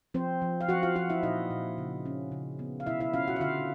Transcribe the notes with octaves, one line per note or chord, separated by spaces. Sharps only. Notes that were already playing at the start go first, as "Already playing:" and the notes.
F3 C4 C5
F3
F5
F3 F#4 F#5
F4 F5
F3 F#4 F#5
E4 E5
A#2 D#4 D#5
A#2
C#3
C#4
C#3
B3
F5
B2 E4 E5
E4 E5
C#4 F4 F5
F#4 F#5
E5
D3 F4 F5